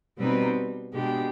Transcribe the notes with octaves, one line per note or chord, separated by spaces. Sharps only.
B2 G3 C4 D#4 B4
B2 G#3 D4 G4